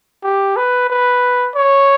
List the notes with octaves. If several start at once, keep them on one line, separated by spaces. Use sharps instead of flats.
G4
B4
B4
C#5